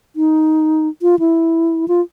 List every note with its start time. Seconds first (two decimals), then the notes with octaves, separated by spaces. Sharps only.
0.16 D#4
1.02 F4
1.19 E4
1.88 F4